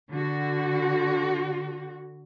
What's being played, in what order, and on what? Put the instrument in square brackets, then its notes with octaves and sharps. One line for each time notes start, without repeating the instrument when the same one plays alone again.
[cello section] D3 F#4